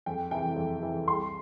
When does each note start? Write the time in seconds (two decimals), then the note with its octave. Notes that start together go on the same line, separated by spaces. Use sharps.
0.06 F2 G5
0.31 C3 E3 G5
0.56 F2
0.81 C3 E3
1.07 C2 C6